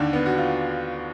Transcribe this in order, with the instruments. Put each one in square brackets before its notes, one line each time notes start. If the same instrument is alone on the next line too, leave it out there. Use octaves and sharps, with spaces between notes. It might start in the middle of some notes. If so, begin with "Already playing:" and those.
Already playing: [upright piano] D#2 D3 D4
B3
F#4
F4